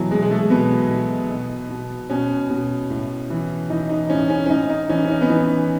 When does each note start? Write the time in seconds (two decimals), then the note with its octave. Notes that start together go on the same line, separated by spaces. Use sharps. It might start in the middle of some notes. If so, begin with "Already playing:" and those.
Already playing: B2 E3 F#3
0.11 B2 G#3
0.22 G#3
0.31 A3
0.50 B2 B3
0.90 B2
1.30 B2
1.70 B2
2.10 B2 C#4
2.50 B2
2.90 A2
3.30 E3
3.70 E3 D#4
3.90 D#4
4.10 A2 C#4
4.30 C#4
4.46 C#4
4.49 A2 D#4
4.69 D#4
4.89 E3 C#4
5.04 C#4
5.10 D#4
5.21 B3
5.29 E3 C#4